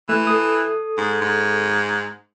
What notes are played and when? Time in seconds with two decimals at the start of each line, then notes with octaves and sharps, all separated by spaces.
0.09 E3 A3
0.27 A4 D#6
0.98 G#2
1.21 G#2